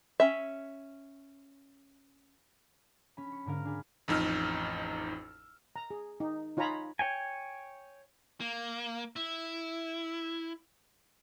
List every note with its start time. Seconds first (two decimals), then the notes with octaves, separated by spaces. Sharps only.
0.20 C#4 E5
3.17 C#4 B5
3.32 C#6
3.46 G#2 D3 A#4 F5
3.65 D4 G#4 B4
4.08 A1 F2 D#4 E6 F6
5.76 A#5
5.91 G#4
6.20 D#4
6.57 D#4 F4 C#5 G#5 A#5 B5
6.99 C#5 G5 G#5
8.40 A#3
9.16 E4